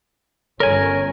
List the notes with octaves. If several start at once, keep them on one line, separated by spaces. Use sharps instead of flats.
G1 C#4 A4 A#4 C#5 G#5